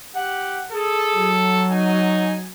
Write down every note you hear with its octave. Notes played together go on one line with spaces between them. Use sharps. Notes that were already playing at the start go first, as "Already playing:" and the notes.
G4 F#5
G#4 A4
F#3
D#4 G#5